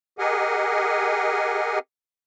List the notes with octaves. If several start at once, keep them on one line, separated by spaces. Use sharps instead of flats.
G4 G#4 A#4 D#5 F#5 G#5